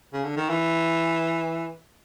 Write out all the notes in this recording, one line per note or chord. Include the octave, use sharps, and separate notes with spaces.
C#3
D3
D#3
E3